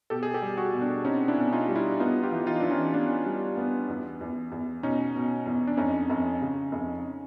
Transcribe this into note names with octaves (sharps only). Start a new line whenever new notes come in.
B2 G4 A4
G#4
G4 A4
G3
F#4 G#4
B2
D4
C4 C#4 D#4
D4 E4
B2
D#4 F4
G3
D4 E4
B3 D#4 F4
F4 G4
E3
D#4 F4
E3 D4
C#4 D#4
B3 D4
G3
B3
E2
E2
E2
B2 C#4 D#4
B2
E2
D4
F2 C#4 D#4
F2
C#3
F2